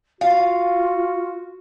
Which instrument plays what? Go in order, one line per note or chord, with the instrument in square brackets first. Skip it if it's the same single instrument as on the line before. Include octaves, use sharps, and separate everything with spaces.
[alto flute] F4 [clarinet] F#4 [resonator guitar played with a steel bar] F5